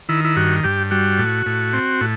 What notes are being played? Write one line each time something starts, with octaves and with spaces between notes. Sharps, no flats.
D#3 E4
E4
G2 F#4
G2 G4
G3 F#4
A2
A2
C4
A2